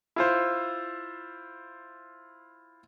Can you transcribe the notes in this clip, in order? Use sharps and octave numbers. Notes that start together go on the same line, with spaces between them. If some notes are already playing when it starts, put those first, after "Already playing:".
E4 F4 C5